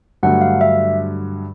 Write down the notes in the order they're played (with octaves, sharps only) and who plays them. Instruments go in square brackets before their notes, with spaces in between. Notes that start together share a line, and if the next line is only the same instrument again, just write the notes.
[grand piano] G2 D3 F#3 A3 [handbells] F#5
[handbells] F5
E5